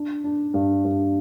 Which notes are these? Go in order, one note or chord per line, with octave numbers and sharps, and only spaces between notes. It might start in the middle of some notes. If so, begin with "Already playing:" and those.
Already playing: D4
D4
G2
G2